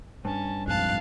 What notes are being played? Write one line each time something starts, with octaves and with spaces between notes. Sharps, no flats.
G2 C#4 A5
A#1 F2 G#2 F5 A5 F#6